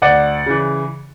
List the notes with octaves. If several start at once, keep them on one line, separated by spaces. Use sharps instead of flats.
D2 D5 F#5
C#3 E3